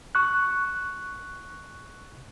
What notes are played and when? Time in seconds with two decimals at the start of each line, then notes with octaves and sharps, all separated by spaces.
0.15 C#6 F#6